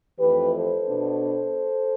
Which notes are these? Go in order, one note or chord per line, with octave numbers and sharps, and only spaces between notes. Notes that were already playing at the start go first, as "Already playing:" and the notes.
F2 E3 A3 G4 B4
A4 C5
B2 B3 D4